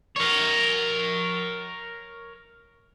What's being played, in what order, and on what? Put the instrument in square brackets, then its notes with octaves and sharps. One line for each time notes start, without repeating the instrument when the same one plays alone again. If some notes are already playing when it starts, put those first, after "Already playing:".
[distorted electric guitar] A#4 C#5